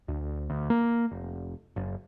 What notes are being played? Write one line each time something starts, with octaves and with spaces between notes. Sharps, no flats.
D2
D2
A#3
F1
F#1